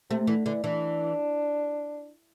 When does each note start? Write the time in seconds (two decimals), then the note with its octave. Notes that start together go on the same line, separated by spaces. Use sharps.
0.10 C3 A3
0.27 D3 E3
0.46 D3 E3
0.64 E3 D4